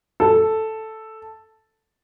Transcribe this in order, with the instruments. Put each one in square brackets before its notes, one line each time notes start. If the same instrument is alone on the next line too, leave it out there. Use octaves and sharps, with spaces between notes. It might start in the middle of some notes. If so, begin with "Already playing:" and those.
[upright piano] A4